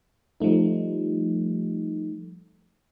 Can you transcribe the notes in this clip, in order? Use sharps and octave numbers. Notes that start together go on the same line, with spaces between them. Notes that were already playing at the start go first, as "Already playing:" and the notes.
F3 G3 A3 D#4